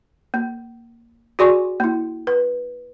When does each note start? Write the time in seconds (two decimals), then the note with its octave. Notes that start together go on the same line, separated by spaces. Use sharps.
0.34 A#3
1.39 F#4 G#4 D5 G#5 C6 C#6
1.80 A#3 E4
2.27 B4